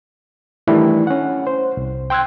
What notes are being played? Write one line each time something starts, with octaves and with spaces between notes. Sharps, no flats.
D#3 E3 G3 A3 D4 E4
C#4 F#5
C5
C2
G5 C6 E6 F#6 G#6